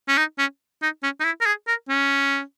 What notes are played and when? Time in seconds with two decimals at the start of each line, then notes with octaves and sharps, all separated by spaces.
0.08 C#4
0.18 D#4
0.39 C#4
0.82 D#4
1.03 C#4
1.20 D#4
1.24 E4
1.41 A#4
1.46 G#4
1.67 A#4
1.89 C#4